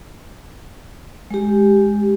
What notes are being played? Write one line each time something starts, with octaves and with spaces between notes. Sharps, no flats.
G#3 G4